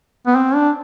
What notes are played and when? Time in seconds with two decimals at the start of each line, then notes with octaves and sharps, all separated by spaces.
0.27 B3
0.36 C4
0.54 D4